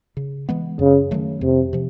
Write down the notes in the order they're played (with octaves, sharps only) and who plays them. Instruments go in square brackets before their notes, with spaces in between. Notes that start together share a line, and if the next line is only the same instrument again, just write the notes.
[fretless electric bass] C#3
E3 G#3 B3
[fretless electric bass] F#2 [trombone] C#3
[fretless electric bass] D#3 F#3 A3
[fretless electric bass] F2 [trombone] C3
[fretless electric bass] C3 F3